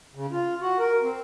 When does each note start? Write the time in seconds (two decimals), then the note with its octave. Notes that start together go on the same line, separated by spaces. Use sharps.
0.15 C#3
0.32 F4
0.62 F#4
0.79 A#4
1.02 C4